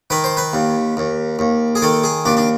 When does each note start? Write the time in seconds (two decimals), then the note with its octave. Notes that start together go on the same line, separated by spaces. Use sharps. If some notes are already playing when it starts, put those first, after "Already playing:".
0.10 D#3 B4
0.24 C5
0.37 B4
0.53 D#2
0.97 D#2
1.39 D#2
1.75 G#4
1.82 D#3 A4
2.04 G#4
2.25 D#2 D4
2.37 D4